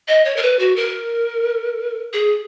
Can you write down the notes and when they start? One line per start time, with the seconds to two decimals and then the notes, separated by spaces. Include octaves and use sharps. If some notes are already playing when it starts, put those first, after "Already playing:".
0.08 D#5
0.25 C#5
0.36 A#4
0.43 B4
0.59 F#4
0.76 A#4
2.13 G#4